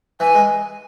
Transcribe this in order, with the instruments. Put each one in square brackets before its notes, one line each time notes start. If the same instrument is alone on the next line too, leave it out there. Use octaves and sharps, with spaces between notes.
[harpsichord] E3 [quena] G#5
[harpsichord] G#3